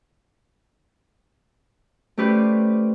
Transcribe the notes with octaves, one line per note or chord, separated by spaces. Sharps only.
A3 C#4 G4 B4 C5 D5